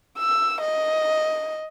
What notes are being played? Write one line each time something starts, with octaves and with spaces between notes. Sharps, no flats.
E6
D#5